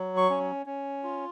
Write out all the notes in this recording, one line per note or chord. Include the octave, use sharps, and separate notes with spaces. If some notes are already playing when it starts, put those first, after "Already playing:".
Already playing: F#3
C#6
C#4
C#4
F4